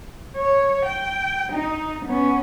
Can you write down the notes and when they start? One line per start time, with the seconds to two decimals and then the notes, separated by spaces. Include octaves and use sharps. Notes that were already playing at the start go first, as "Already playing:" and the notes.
0.36 C#5
0.85 G5
1.52 D#4
2.05 B3 C#4